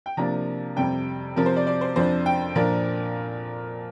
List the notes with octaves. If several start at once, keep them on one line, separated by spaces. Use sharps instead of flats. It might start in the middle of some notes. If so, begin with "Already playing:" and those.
G5
C3 F3 A#3 D4 A#5
F2 C3 G3 G5
C3 F3 C4 A#4
C5
D5
D5
C5
F2 F3 D4 C5
G5
A#2 F3 A#3 D4 A#4